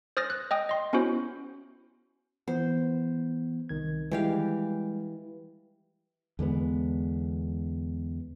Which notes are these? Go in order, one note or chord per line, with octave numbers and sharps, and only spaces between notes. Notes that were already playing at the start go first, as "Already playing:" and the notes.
C5 D#6 F6 A6 A#6
F#6
D#5 G5 D#6
D#5 C6
B3 C#4 E4 F#4 C5
E3 B3 C5
C2 D#3 G#6
E3 G3 G#3 G4 F5
E2 D3 G#3 B3